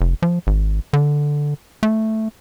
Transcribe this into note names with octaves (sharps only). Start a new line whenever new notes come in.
F1
F3
G#1
D3
A3